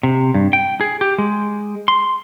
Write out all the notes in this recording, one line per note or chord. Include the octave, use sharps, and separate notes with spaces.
C3
G2
G5
G#4
G4
G#3
C6